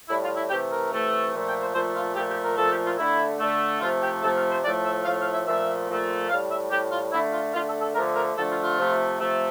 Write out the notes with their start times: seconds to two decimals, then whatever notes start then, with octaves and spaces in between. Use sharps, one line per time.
0.09 A2 G3 E4
0.23 F4
0.36 E4
0.50 C3 E3 A3 G4
0.71 A#4
0.91 C3 E3 A3
1.33 A#2 F3 A3
1.47 G5
1.61 C5
1.74 A#2 F3 A3 C5
1.95 F4
2.16 A#2 F3 A3 G4
2.29 G4
2.45 A#4
2.57 A#2 F3 A3 A4
2.71 G4
2.85 F4
2.98 D3 A3 E4
3.40 D3 A3
3.81 C3 F3 A3 F4
4.02 G4
4.23 C3 F3 A3 A4
4.36 F5
4.50 C5
4.64 A2 F3 A3 D5
4.85 E5
5.05 A2 F3 A3 F5
5.19 F5
5.33 E5
5.46 A#2 F3 A3 E5
5.89 A#2 F3 A3
6.30 A2 F5
6.33 G3
6.50 E5
6.71 A2 G3 G4
6.92 F4
7.12 D3 A3 E4
7.33 F4
7.53 D3 A3 F4
7.67 A4
7.81 A4
7.95 D3 F3 A3 A#4
8.16 A#4
8.36 D3 F3 A3 A4
8.50 F4
8.64 F4
8.78 C3 F3 A3
9.19 C3 F3 A3